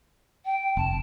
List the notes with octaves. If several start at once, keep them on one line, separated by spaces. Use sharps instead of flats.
G5
F1 A5